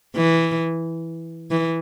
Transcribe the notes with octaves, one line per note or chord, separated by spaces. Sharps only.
E3
E3